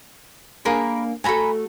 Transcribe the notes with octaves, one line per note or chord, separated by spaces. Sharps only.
A#3 D4 G#4 A#4 B5
A3 F#4 A4 G#5 A#5 B5